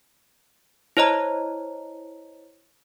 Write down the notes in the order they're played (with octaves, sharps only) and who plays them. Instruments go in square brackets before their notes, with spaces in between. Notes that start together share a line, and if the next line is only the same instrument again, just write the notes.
[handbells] E4 C5 C#5 D#5 A#5